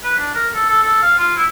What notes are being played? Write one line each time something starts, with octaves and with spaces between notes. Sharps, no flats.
B4
D4
A#4
A4
A4
A4
F5
F4
E4